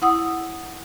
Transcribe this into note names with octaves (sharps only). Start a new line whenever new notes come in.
E4 F#5 D#6 E6